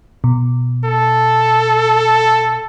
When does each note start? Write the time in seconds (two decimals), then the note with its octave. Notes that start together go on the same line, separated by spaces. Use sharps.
0.24 B2
0.85 A4